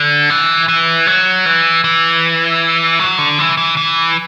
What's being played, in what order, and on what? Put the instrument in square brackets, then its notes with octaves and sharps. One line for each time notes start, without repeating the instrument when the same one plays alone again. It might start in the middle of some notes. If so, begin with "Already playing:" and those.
Already playing: [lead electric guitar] D3
E3
E3
F#3
E3
E3
F#3
D3
E3
E3
E3